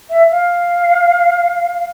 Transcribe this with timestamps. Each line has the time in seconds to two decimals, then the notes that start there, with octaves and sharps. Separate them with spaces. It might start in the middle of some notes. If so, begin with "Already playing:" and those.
0.09 E5
0.31 F5